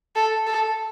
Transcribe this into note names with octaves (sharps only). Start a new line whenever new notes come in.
A4
A4